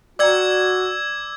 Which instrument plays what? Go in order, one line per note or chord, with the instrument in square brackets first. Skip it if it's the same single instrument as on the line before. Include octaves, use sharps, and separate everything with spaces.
[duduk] F#4 [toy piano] D5 G5 A#5 [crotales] D6 E6 G#6